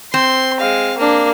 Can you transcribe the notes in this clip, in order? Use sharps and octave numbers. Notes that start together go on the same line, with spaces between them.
C4 C6
G#3 F5
A#3 D4